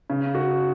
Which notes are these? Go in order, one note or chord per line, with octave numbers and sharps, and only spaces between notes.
C#3
F#4